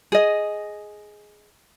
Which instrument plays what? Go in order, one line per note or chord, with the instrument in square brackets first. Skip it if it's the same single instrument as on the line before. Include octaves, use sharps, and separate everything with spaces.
[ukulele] G#4 D#5